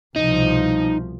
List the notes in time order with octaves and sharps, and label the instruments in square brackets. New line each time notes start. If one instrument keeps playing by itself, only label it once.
[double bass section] C2 B2 F3 [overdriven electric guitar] D#4